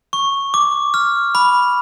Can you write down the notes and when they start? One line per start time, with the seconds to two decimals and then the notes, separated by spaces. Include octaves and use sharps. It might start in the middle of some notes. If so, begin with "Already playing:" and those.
0.13 C#6
0.54 D6
0.94 F6
1.35 B5